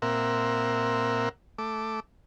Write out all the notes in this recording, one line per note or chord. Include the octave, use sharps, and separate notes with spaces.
A#2 C4 A#4 E5 F#5
A3 D6